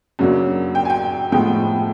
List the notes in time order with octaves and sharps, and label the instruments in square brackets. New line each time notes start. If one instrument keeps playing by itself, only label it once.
[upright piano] F#2 C#3 F#3 A#3 D4
G5
G#5
G5
A2 F3 G#3 B3 G5